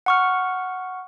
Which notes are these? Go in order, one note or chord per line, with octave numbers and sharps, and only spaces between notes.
F#5 C#6 F6